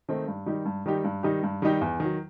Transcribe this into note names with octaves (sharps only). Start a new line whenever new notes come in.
D#3 A3 C4 D#4
G2
D#3 G3 D#4 G4
G2
D#3 G3 D#4 G4
G2
D#3 G3 D#4 G4
G2
D#3 G3 D#4 G4
E2
D#3 F#3